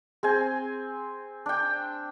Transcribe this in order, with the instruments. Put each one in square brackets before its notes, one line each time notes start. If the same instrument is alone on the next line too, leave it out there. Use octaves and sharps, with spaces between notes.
[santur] C4 G#5 [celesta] G#4
[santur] D4 G5